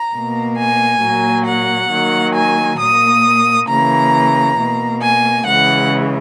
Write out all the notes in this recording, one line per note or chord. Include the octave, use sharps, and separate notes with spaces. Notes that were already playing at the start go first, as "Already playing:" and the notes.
Already playing: A#5
B2 A#3
G#5
A#2 F#3 A#3
F#5
D#3 F#3 A#3
G#5
A#2 A#3 D#6
C#3 E3 A#3 A#5
B2 A#3
G#5
C#3 E3 G#3 F#5